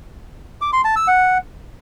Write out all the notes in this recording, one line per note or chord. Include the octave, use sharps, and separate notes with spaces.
D6
C6
A5
E6
F#5